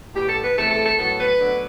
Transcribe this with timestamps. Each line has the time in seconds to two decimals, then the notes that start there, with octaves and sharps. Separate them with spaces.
0.14 A2 G3 B3 G4
0.28 A4
0.42 B4
0.56 E2 C3 E3 A3 A4
0.70 A4
0.84 A4
0.97 A2 F#3 B3 A4
1.18 B4
1.38 D2 D3 F#3 B3